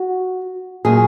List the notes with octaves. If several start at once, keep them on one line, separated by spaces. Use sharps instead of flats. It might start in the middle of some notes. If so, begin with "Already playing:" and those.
Already playing: F#4
A#2 F#3 A3 G#4